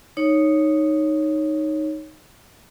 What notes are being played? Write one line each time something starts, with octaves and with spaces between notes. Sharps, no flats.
D#4 C#5